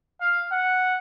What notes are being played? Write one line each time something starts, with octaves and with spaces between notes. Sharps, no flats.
F5
F#5